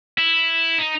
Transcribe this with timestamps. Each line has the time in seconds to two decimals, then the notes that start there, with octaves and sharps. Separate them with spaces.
0.18 E4
0.78 D#4